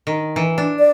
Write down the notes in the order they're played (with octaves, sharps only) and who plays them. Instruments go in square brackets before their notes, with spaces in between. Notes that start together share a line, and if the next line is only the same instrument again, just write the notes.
[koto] D#3
E3
D4
[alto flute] D5